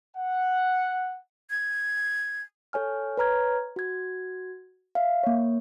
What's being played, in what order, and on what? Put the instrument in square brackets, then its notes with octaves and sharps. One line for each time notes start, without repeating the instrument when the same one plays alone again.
[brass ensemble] F#5
[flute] G#6
[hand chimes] A4 C#5 G#5 F6
B4 C#5 A#5 F6 G#6
F#4 G#6
E5 F5
A#3 C#5